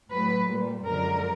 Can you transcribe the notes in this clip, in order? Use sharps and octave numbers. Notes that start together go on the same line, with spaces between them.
A2 F#3 A3 B4
A#2 G3
F#2 D3 F3 G#3 A#4